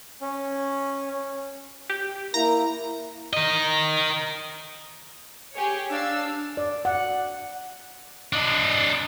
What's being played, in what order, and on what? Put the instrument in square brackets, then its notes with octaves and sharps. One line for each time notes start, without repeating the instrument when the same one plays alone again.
[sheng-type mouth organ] C#4
[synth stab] G4
[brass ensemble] A#3 E4 [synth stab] A#5
[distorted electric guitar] A#4 D#5
[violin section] G4 G#4 C#5
[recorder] D4 [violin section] F5 E6
[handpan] D5
F#5
[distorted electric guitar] D4 D#5